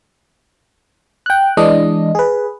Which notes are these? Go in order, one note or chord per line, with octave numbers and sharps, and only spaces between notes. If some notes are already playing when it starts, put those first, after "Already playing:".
G5 F#6
E3 G#3 D4 D#5
G#4 B4